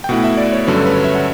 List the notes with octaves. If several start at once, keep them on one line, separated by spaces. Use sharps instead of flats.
G5
B2 A3 E4 F#5
E5
D5
C#5
G2 D3 F#3 C#4 B4
A4
B4
C#5
E5
F#5